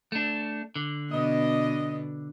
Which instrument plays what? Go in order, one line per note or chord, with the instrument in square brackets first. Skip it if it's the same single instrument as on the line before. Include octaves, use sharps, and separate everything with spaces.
[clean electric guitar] A3 D4
D3
[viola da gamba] B2 B3 D4 [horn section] D#5